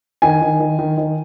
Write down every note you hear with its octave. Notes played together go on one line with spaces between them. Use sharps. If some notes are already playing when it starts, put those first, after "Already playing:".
D#3 G#5
D#3
D#3
D#3
D#3